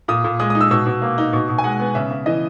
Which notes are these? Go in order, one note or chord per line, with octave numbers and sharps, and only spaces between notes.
A#2 D#6
A#2
G#3 D#6
D#6
D#4
E6
B2 E6
B2
A#3
D#4
B2
B2
G#5
G#3 F#5
B3
C#3 E5
C#3
E3 D#5